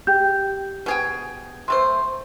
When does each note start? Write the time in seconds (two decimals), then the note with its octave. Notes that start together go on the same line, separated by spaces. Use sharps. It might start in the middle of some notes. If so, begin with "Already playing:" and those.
0.07 G4 G6
0.86 B2 G#4 G5
1.68 C3 A3 C5 C6